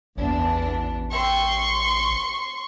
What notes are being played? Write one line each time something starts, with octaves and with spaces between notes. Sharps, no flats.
A1 E2 E3 D4
G4 E5 G5 C6 C#6